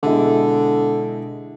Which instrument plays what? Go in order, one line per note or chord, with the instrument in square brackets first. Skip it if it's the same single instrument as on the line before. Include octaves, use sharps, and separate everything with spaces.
[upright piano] B2 G#3 E4 [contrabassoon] D3